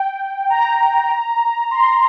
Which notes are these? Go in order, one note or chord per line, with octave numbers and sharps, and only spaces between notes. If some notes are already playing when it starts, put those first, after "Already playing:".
Already playing: G5
A#5
C6